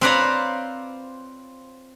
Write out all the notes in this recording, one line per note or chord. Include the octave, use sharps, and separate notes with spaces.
C4 F4 B4 C#5 D5 A#5